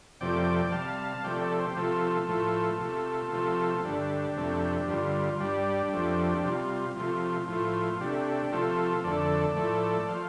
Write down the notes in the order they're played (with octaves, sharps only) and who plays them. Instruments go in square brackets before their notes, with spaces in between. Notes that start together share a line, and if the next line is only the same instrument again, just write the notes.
[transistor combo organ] F2 C3 F3 A3 D5 G5
C3 G3 F5 A5
C3 F3 A3 D5 G5
A4 D5
G4 C5
C3 F3 A3 F4 A4
A2 F3 A3
C3 A3
C3 F3 A3
F4
G2 D3 A3 D4 G4
F2 C3 A3
G2 D3 G3 F4
G2 G3 D4 G4
F2 F3 A3
C3 G3 F4
C3 F3 A3 F4
A2 F3 A3 F4
C3 A3 D4 G4
C3 F3 A3 F4 A4
F2 D3 A3 A4 D5
A2 F3 A3
F3 A3 C5 F5